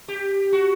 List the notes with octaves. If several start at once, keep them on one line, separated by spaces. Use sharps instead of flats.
G4
F#4